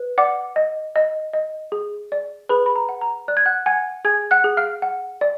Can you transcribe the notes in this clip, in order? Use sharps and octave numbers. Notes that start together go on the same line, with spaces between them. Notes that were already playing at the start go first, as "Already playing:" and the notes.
Already playing: B4
D5 F#5 D6
D#5
D#5
D#5
G#4
D5
G#4 B4 B5
B5
A#5
F#5
A#5
D5 F#6
G#6
F#5 F#6
F#5 G#5 G#6
G#4 G#5 G#6
F#5 F#6
G#4
F5 F6
F#5
D5